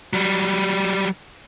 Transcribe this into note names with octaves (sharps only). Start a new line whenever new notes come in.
F#3 G3